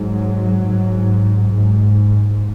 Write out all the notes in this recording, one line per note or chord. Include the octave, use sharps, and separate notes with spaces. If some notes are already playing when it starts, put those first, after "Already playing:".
Already playing: G#2 F#3
G#2
G#2